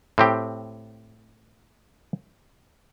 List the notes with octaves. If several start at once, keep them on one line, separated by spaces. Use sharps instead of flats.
A2 C4 G4